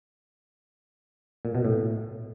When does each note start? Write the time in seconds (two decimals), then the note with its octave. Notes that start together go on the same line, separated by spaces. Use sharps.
1.45 A#2
1.55 B2
1.65 A2